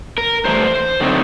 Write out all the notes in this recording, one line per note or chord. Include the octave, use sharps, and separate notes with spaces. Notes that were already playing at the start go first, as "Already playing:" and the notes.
A#4
G2 E3 A3 C5
D3 F#3 A3 C4 D#4